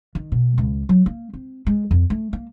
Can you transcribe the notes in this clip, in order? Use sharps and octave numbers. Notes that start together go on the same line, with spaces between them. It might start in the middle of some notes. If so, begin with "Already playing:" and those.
D#3
B2
C#2
F#3
A#3
C4
G#3
F2
A3
A#3